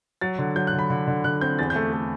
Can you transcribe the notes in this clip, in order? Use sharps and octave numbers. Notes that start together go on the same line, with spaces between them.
F#3 A6
D3
F#3 G6
F#6
D3
B5
D3
D3
D3 F#6
C4 G6
E2 A6
G6
A3
A3